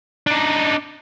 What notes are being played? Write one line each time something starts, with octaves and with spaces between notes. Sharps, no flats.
D4 D#4